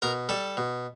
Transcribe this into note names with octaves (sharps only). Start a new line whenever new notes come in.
B2 A#4 A#5
G3 A4 A5
B2